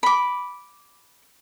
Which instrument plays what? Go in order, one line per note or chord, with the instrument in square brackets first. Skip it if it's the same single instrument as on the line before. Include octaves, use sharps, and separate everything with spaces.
[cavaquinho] B5 D6